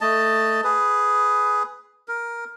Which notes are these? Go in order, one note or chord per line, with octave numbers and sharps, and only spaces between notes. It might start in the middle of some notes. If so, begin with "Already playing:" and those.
A3 D#5 A5
G#4 B4
A#4